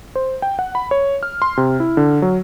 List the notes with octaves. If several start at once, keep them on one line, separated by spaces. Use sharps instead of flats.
C5
G5
F#5
B5
C#5
F6
C6
C3
E4
D3
F#3